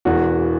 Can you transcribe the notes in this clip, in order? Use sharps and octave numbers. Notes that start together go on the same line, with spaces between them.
E1 E2 E3 F#4